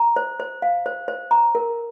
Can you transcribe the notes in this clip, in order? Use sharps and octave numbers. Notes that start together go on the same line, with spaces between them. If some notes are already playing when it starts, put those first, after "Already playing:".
Already playing: A#5
C5
C5
F5
C5
C5
A#5
A#4